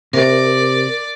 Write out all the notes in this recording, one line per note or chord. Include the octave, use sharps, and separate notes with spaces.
C3 A#4 D5